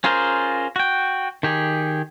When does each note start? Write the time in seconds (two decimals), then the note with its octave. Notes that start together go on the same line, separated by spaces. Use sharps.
0.04 C#4 F4 G#4 A#4 C5
0.76 F#4 G5
1.43 D#3 G4 G#4